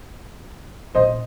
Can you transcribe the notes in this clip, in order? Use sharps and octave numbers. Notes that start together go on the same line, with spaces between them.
A#2 C5 D#5